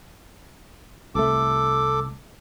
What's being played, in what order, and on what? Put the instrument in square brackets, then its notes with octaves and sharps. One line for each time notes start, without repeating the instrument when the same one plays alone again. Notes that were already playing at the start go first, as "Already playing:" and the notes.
[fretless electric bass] C2 A3 [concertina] A4 D6